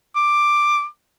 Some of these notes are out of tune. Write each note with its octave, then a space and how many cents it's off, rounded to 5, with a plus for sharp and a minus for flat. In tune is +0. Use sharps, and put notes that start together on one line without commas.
D6 +10